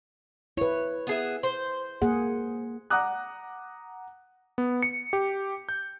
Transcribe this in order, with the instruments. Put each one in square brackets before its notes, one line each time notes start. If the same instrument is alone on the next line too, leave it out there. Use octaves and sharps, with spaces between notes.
[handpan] E4 B4 [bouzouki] C#5
[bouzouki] B3 G#4 E5
C5
[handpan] A#3 G#4 F#5
[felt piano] F#5 A#5 D6 D#6 F#6
[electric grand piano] B3
C#7
G4
G6